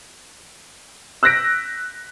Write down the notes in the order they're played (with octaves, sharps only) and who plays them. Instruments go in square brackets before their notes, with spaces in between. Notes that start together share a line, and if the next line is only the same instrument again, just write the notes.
[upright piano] E6 F#6 G6 A#6 B6 D7